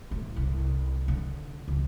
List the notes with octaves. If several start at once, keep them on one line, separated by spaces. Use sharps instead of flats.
A2
C2
D3
C#2